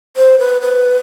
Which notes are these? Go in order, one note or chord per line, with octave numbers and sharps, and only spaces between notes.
C5
B4
B4